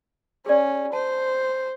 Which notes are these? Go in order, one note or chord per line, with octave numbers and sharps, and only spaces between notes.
C#4 G#4 D5
C5 A5